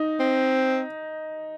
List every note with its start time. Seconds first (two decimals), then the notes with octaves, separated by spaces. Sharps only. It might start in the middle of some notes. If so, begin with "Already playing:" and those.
Already playing: D#4
0.20 C4